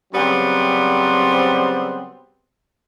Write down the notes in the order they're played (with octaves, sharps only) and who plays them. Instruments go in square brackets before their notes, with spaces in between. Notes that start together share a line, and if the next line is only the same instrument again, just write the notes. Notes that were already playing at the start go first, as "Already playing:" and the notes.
[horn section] C#3 F#3 G3 B3 C4